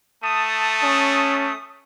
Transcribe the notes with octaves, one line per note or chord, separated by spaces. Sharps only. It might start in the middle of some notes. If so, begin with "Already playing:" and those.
A3 A5 D#6
C#4